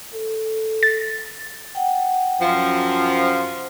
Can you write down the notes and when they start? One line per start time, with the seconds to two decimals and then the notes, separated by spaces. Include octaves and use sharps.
0.14 A4
0.83 A6
1.75 F#5 G5
2.41 F#2 F3